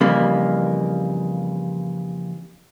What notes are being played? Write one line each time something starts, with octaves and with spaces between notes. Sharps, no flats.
F2 C#3 E3 G3 A#3